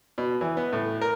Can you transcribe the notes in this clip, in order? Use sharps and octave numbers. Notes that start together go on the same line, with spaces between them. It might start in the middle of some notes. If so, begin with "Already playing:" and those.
B2
E3
B3
A2
A#4